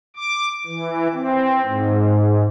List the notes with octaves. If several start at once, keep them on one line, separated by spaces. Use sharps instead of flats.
D6
E3
C4
G#2